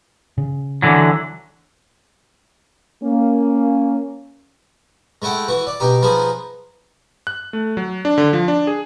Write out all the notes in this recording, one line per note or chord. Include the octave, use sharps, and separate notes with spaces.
C#3
D3 E3 F#3
A#3 C#4
G#3 A3 E4 F#5 G5
E3 F#4
D5
B2 D#4 G4
F3 B3 D#4 G#4 C5
F#6
A3
F#3
D4
D3
F3
D4
G#4